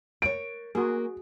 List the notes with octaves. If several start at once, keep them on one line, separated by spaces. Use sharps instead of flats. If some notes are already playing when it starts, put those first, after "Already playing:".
A#4 C#5 D7
A#3 F#4 G#4